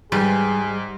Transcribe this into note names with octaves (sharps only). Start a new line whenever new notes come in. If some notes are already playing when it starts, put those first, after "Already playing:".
G#2 G3 G#4